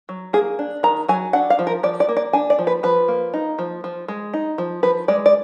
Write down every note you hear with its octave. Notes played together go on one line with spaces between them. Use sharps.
F#3
A#3 G#4
D4
D#3 A#5
F#3 G#5
D4 F#5
F5
F3
A#4
F3 D5
D5
A#3
D5
D4 G#5
D5
F3
B4
F3 B4
A#3
D#4
F3
F3
G#3
D#4
F3
F3 B4
G#3 D5
D5